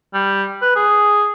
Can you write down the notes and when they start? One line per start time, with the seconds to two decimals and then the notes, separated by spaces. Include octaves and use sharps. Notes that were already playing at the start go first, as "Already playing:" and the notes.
0.14 G3
0.62 B4
0.75 G#4